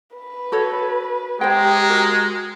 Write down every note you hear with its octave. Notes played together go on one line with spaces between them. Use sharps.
B4
F#4 A4 C#5
G#3 G4 C5 G5 A#5
F#4 A#4